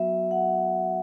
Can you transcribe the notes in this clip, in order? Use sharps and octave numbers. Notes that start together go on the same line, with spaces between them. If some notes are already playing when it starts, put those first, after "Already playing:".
Already playing: F#3 B3 F#4 E5
F#5